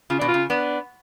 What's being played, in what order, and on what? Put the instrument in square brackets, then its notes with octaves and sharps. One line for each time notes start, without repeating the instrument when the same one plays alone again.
[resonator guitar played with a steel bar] C#3 [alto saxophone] F4
[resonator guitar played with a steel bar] B2 [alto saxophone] D4
[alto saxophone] F4
[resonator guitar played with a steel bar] C#3
[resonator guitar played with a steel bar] B3 [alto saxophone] D4